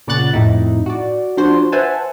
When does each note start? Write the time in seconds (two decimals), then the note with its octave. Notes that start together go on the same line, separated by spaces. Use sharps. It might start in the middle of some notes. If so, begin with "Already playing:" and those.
0.07 A#2 C#3 D5 F#5 F#6 A6
0.33 F2 A2 D#4 E4
0.86 F#4 D5
1.37 F3 D4 F#4 C5
1.72 B4 C5 E5 F#5 G#5 A5